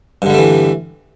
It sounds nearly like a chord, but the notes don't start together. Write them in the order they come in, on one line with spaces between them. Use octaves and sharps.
G2 D3 G3 A3 E3